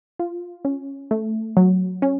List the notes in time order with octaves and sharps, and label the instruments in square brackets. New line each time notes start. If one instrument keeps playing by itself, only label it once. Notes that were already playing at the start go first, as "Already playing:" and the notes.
[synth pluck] F4
C#4
A3
F#3
C#4